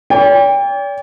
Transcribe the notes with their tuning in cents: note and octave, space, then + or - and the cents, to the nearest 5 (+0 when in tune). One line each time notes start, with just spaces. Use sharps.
D5 -45 G5 +30